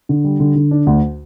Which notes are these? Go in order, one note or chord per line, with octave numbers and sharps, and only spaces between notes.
D3
G3
D3
D3
D4
D2